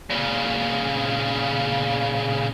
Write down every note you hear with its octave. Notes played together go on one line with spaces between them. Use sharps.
A#2 C#3